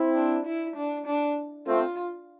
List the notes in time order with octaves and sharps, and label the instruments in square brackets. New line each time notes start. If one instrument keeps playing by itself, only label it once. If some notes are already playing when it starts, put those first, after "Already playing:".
Already playing: [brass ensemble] C4 E4
[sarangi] D4
E4
D4
D4
[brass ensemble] A3 C4 [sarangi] F4